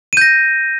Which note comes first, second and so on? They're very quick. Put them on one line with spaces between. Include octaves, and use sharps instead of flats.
D#7 G6 A#6